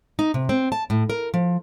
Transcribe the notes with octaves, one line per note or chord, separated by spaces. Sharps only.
D#4
C3
C4
A5
A2
A#4
F3